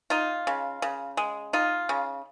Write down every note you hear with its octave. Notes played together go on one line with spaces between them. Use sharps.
D#4 F4
C#3
C#3
G#3
D#4 F4
C#3